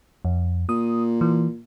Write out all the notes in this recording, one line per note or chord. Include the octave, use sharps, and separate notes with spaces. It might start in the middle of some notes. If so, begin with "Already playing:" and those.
F2
A#2 D#6
E3